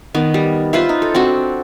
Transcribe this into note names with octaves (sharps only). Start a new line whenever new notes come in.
D#3 B3
G3
F4 B4 C5 E5
D#4
A4
C4 D4 F#4